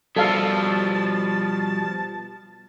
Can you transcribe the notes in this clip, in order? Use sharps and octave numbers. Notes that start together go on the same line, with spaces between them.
B2 F3 G3 A4 F5 A5